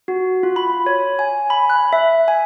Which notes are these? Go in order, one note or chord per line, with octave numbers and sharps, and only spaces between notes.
F#4
F4
B5
C#5
G#5
B5
F#6
E5
G#5